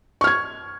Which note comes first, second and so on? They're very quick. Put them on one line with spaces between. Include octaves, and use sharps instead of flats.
C#6 F6 G#6